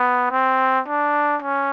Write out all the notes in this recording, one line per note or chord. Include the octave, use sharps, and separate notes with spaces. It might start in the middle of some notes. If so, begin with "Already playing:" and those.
Already playing: B3
C4
D4
C#4